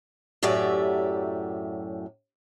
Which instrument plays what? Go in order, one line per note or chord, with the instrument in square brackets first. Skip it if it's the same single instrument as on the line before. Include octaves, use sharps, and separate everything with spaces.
[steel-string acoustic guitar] F#2 A2 F#3 G4 D5 E5